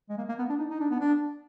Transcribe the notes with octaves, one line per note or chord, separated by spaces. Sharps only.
G#3
A#3
A#3
B3
D4
D#4
D#4
D4
B3
D4